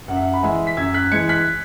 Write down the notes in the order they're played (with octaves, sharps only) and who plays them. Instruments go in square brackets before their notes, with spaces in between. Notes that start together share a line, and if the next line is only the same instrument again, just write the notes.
[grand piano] F#2 F#5
E5
F#5
B5
E3 G#3 E5 G#5
B6
F#2 E6 G#6
F#6 B6
E3 G#3 G#6 C#7
F#6 B6